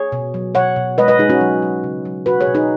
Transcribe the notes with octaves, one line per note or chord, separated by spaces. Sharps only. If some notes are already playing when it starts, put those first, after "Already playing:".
Already playing: G#4 C#5
B2
F#3
B2 C#5 F#5
B2
G#3 B4 D#5
B4 D#5
G#3 D#4 G#4
C#4 F#4
F#3
F#3
C#3
F#3
B2 F#4 B4
G#4 C#5
B2
D#4 G#4